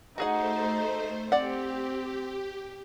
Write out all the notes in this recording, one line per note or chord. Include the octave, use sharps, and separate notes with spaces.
A3 D#4 F#4 G#4 C5 F#5
C4 G4 D5 F#5